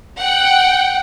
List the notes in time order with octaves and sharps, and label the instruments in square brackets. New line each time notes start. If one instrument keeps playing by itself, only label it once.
[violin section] F#5 G5